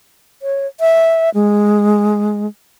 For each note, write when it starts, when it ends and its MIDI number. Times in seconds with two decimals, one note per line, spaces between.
0.42 0.67 73
0.80 1.30 76
1.35 2.47 56